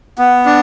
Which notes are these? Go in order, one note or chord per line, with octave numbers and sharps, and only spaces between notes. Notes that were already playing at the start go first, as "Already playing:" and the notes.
B3
D4